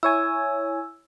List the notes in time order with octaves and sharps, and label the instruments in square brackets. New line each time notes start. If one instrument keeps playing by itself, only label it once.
[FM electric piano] E4 C#5 G#5 [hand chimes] E6